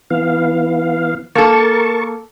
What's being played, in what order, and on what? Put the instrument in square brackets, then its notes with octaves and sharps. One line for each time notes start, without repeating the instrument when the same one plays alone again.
[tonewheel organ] E3 B3 F5
[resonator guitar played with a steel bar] A#3 A4 [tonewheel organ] A#4 A5 C#6